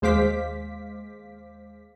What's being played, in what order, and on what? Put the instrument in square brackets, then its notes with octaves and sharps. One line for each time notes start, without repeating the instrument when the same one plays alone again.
[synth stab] D#2 G#3 C5 F5 D6 B6